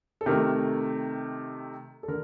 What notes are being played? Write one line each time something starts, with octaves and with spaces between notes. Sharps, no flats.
A4
C3 D#3 A3 A#4
A4
D3 A#4